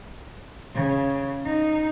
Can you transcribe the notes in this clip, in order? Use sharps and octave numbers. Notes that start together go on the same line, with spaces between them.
C#3
D#4